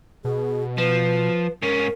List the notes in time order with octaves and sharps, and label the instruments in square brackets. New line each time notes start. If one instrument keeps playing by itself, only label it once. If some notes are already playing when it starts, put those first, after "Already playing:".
[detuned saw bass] B2 [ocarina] G#4
[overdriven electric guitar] F3 [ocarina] B4
[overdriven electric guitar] G#2 C#4 [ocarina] A#4